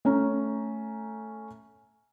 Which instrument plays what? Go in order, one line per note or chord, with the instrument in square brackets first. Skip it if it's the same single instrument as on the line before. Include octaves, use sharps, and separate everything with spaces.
[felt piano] A3 C#4 A#5